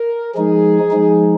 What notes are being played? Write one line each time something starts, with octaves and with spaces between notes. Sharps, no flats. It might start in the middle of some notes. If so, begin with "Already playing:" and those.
Already playing: A#4
F3 G#3 D#4 G#4
F3 G#3 D#4